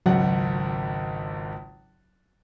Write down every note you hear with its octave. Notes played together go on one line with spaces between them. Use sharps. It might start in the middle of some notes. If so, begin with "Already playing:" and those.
G#1 C#2 F#3 F#5